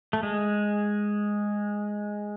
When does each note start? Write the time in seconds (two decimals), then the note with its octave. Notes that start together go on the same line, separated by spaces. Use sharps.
0.13 A3
0.23 G#3